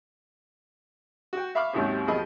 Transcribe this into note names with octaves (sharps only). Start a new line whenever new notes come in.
F#4 G5
E5 F5 B5 C#6 D6 F6
D#2 G#2 C3 D#3 F#3 C#4
D#2 B2 F3 G#4 D#5 B5